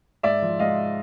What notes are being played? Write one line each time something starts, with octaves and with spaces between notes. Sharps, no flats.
G#2 D5 E5
F3
G#2 D#5 F5